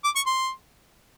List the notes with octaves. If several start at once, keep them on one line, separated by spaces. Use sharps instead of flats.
D6
C#6
C6